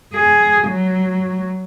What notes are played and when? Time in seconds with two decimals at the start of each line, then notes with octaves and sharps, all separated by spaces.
0.14 G#4
0.68 F#3